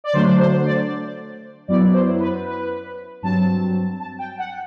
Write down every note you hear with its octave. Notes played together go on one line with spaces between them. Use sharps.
D5
D3 F#3 A3 D4 C5
C5
D5
F#2 F#3 B3 E4 D5
C5
B4
B4
G2 F#3 C4 A5
A5
G5
F#5